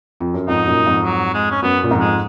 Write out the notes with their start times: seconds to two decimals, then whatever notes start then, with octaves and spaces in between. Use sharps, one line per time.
0.20 F2
0.34 F#2
0.48 F2 G#2 D#4
0.67 F#2 A#2
0.86 F2 G#2
1.05 F#3
1.34 G#3
1.51 C#4
1.62 F#2 B3
1.83 A#2
1.91 F2 G#2
2.00 G#3